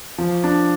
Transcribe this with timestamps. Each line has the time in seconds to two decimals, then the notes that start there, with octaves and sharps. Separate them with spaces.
0.18 F3
0.44 D4